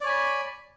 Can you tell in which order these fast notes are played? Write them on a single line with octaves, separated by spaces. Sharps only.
D5 C#5 G#5 B5